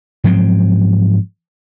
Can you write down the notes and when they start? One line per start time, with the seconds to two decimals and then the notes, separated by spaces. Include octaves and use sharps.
0.24 G#2 F3 F#3 C4